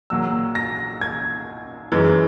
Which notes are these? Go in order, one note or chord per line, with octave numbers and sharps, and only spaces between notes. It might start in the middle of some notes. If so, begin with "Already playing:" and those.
A#1 A#2 F#3 A#3 E6
A#6
G#6
F#2 E3 G#3